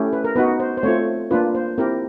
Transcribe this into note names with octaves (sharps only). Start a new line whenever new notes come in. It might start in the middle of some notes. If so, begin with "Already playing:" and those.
Already playing: A3 C#4 E4 G4
B4
A#4
B3 D#4 F#4 B4
C5
C5
A3 C4 F4 C#5
A#3 D4 F4 B4
C5
C4 E4 G4 A#4